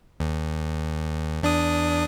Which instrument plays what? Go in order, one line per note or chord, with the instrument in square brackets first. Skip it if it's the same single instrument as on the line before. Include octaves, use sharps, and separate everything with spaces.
[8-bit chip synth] D#2
E2 D4 D#6